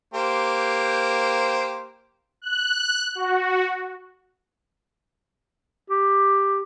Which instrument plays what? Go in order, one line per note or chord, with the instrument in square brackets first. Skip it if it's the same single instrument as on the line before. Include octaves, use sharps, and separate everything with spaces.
[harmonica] A#3 G4 C5
[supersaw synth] F#6
F#4
[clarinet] G4